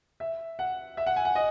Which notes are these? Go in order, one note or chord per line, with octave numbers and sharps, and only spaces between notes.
E5
F#5
E5
F#5
G#5
F#5
D#5